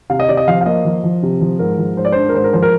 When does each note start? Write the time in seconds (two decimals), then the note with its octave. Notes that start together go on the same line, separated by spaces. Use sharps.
0.10 C3 F5
0.20 D#5
0.29 C3 D5
0.37 D#5
0.47 F3 F5
0.61 F5
0.66 A#3 D#5
0.85 F3
1.04 F3
1.23 C3
1.41 F3
1.59 G#2 A#4
1.78 F3
1.97 G#2 C5
2.05 D5
2.12 D4 C5
2.29 A#4
2.34 G#2 C5
2.44 A#4
2.53 F3 C5
2.63 A#4